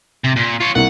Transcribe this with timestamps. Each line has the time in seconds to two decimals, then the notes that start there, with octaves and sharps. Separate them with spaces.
0.24 C3
0.36 A#2
0.61 F4 C#5
0.75 C2 F#5